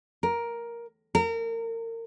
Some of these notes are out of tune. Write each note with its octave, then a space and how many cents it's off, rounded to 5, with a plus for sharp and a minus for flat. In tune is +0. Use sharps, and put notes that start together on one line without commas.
A#4 +10
A#4 -30